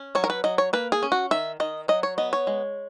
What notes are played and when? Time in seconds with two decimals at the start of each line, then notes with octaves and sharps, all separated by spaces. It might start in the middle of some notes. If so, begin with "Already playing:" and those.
Already playing: C#4
0.15 F#3 C#5
0.24 A#4
0.30 B4
0.44 F#3 D#5
0.58 C#5
0.73 A#3 B4
0.92 G#4
1.03 C#4
1.12 F#4
1.31 D#3 E5
1.60 D#3 D#5
1.88 F#3 D#5
2.03 C#5
2.18 B3 D#5
2.33 C#5
2.47 G#3